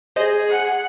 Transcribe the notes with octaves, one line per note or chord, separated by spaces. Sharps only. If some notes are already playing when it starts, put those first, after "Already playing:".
G#4 C5 D#5 G6
F#5